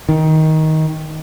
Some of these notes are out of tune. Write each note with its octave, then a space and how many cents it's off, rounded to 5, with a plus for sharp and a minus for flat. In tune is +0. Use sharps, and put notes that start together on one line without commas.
D#3 +15